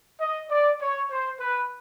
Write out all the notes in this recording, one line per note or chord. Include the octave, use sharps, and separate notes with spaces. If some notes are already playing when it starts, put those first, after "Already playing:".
D#5
D5
C#5
C5
B4